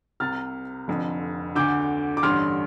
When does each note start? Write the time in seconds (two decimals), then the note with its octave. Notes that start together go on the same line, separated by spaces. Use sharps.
0.20 C2 C3 F6 A6
0.88 F1 F2 D3
1.55 D2 D3 D6 G6
2.17 D6
2.23 A1 G2 D3 C6 F6